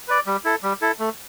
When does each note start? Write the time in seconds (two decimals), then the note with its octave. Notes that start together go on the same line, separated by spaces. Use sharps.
0.08 B4 D5
0.27 G3
0.45 E4 A4
0.63 G3
0.81 E4 A4
0.99 A3